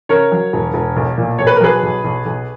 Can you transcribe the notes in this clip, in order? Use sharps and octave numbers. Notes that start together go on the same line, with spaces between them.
C#3 A#4 C#5
F#3
E1
E1
B1
A#2
B1 C#5
B4
A#4
F#3 G#4 B4
B1
B1
B1